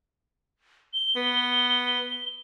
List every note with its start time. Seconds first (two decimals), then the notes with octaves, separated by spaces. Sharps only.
0.94 G7
1.16 B3